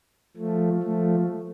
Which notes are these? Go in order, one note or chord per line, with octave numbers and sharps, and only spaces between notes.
F3 A3
F3 A3